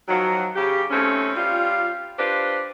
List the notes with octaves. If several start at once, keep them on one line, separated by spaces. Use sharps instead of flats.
D#3 F3 F#3
C#3 G4
D#2 A3 C4 C#4
G3 F4
D4 F4 G4 B4 C5